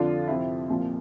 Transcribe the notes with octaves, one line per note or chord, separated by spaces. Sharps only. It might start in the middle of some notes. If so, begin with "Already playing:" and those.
Already playing: F2 D3 F3 D4 F4
F2 C3 F3 C4 E4
C2 A#2 F3